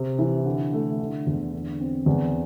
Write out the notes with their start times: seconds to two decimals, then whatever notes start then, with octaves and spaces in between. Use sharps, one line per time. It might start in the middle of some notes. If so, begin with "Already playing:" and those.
Already playing: C3
0.19 E3
0.45 D3
0.73 A3
0.99 D3
1.27 E2
1.52 D3
1.80 C4
2.06 E2